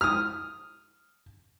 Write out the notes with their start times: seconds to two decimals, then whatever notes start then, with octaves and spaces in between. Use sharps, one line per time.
0.01 D#6 F6